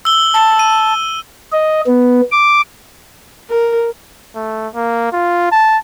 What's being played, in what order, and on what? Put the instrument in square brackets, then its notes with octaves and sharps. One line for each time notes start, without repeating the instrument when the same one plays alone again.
[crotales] E6 G7
[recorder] A5
[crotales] D#7
[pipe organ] D#5
B3
D6
[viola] A#4
[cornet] A3
A#3
F4
A5